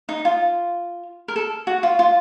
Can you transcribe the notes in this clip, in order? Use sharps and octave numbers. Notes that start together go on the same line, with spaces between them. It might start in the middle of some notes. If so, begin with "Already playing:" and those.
D#4
F4
A#4
A4
F#4
F4
F4